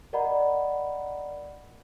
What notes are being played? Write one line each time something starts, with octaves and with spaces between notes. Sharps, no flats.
A#4 D5 D#5 F#5 A#5 B5